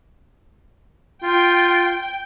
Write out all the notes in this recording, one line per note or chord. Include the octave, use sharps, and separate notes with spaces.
F4 G5